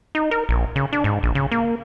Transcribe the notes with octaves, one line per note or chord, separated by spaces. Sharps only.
D#4
A#4
A#1
C#3
D4
G#2
A#1
C#3
A#3